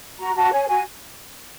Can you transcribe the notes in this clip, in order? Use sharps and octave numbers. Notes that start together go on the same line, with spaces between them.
F#4 A#5
F#4 A5
C#5 G#5
F#4 G#5